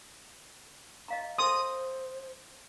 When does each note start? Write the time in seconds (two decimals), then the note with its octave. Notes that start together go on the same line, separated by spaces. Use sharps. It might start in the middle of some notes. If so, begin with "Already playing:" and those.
1.08 D#5 F5 A#5
1.38 A4 C5 C6 D#6